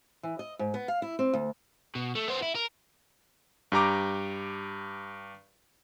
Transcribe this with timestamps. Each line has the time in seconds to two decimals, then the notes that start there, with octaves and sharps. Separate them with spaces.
0.23 E3
0.39 D#5
0.59 G#2
0.74 B3
0.88 F5
1.02 E4
1.19 C4
1.34 D2
1.95 B2
2.15 A3
2.28 B3 C5
2.42 E4
2.55 A#4
3.72 G2 G4 A#5 D6